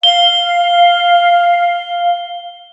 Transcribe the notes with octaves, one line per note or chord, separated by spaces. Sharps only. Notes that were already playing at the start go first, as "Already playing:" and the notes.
F5 G7